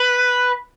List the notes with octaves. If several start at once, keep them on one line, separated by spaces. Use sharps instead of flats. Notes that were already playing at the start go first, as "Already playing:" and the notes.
Already playing: B4